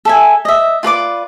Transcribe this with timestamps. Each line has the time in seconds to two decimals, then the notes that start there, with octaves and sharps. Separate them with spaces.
0.05 A4 E5 G#5
0.45 D#5 E5
0.83 F4 B4 D5 D6